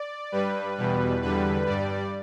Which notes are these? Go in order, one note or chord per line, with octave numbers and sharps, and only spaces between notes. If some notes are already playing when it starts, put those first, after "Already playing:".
Already playing: D5
G2 G3 B4
E2 B2 G3
E2 D3 G3 B4
G2 G3 D5